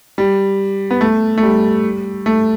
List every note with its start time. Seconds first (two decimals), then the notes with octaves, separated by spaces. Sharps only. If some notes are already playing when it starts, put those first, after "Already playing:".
0.18 G3
0.91 B3
1.01 A3
1.38 A3
1.43 G3
2.26 A3